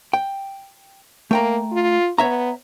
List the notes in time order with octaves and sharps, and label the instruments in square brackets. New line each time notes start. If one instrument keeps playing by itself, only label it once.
[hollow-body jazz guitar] G5
[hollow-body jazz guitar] A3 G5 A#5 [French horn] A#3
[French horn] F4
[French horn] B3 [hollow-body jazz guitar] C#5 E5 A#5